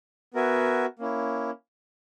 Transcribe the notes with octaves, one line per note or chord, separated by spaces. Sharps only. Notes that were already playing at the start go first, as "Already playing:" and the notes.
B3 F#4 A#4 E5 G#5
A#3 C#4 E4